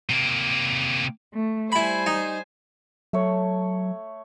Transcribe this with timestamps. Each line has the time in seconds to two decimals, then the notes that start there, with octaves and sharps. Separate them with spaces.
0.10 C3 A#3
1.34 A3
1.72 G3 E4 C5 G#5 B5
2.06 D#4
3.13 F#3 A3 C#5